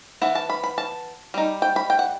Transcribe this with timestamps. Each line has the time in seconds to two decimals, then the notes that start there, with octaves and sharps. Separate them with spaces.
0.22 E3 B3 E4 F#5
0.35 A5
0.50 B5
0.64 B5
0.78 A5
1.34 G3 D#4
1.62 G5
1.76 B5
1.90 G5
1.99 F#5